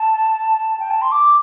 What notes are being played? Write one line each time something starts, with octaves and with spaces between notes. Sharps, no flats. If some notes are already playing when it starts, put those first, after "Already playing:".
Already playing: A5
G5
A5
C6
D6